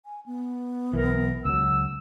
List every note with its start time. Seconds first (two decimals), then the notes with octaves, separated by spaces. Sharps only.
0.05 G#5
0.26 B3
0.93 B1 E3 A#4
1.45 C#2 F#3 E6